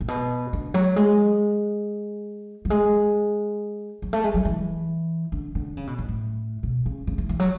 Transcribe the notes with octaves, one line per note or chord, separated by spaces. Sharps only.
A2
B2
D3
F#3
G#3
F#3
G#3
F#3
A3
G#3
F#3
E3
D3
D3
C#3
B2
A2
A2
B2
C#3
C#3
E3
E3
F#3